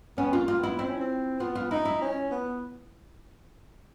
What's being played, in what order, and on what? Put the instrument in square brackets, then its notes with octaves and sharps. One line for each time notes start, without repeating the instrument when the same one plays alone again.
[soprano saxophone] B3 [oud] C#4
[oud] F4
[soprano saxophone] A#3
[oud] F4
[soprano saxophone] B3 [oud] E4
[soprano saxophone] C4 [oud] E4
[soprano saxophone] C#4
C4
[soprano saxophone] B3 [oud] F4
[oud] F4
[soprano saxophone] D#4 [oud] E4
[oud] E4
[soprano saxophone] C#4
B3